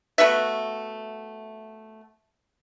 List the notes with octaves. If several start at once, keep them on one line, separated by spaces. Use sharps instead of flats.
A3 B3 F#4 E5